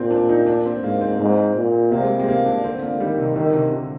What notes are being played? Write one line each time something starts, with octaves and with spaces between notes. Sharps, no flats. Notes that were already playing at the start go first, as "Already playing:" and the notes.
Already playing: A#2 C4 D4
D4
D#4
D4
C4
G#2 A#3
C4
G#2
A#2
C3 A#3
G#3
G3
G#3
A#3
D4
D3 C4
A#3
D#3 G3
C3
D3 D#3
C3
D3